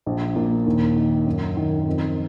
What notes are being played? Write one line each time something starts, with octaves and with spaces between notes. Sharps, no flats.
A#1
A#2
D#2
D#3
F#2
D#3
F2